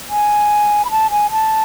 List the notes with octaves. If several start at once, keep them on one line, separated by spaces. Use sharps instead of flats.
G#5
B5
A5
G#5
A5